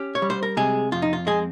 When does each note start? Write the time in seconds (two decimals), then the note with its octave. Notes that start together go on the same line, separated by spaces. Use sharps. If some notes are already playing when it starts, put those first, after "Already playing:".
Already playing: C#4 G4
0.15 C#5
0.22 G3
0.30 C5
0.43 A#4
0.57 C3 G#3 G#4
0.92 F2 F4
1.02 D#4
1.13 F4
1.27 G#3 C4 G#4